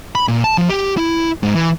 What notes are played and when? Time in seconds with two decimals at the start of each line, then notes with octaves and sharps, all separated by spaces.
0.15 B5
0.28 A#2
0.44 A5
0.58 F3
0.69 G4
0.97 E4
1.43 G#2
1.55 E3